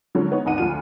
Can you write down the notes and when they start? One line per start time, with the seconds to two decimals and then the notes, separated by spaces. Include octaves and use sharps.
0.15 D3 F3 F#3 G#3 C#4
0.32 B3 D#4 C#5
0.45 G#1 D#2 D#4 F#5 D#7
0.58 D2 F3 F4 D#7